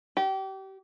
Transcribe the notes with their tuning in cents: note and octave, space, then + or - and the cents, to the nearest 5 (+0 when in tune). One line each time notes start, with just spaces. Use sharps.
G4 -30